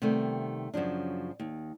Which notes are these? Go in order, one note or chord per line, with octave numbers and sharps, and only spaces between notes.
C3 D#3 G3 A3 B3
F#2 C#3 F3 D4
D#2